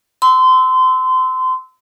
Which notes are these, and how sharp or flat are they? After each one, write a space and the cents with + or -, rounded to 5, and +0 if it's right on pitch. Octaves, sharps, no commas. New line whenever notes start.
C6 -30 E6 -20